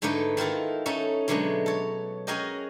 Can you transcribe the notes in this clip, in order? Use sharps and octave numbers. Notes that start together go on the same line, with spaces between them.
G#2 D3 A3 D#4 B4
D#3 E4 F4 A4
A3 C#4 D#4 A4 E5
B2 D3 F#3 G#3 A3 B3
A4 C#5
C#4 F#4 G#4 A#4 D#5 G5